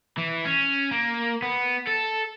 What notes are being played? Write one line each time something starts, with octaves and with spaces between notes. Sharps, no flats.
E3
C#4
A#3
B3
A4